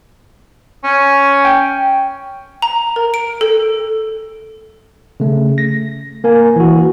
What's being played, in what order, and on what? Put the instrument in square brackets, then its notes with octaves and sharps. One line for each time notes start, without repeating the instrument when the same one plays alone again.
[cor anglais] C#4
[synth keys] G5
[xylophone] A#5
A#4
D7
A4
[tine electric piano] C#3 A3
A#6
A#3 A#4 G#5
E3 F#4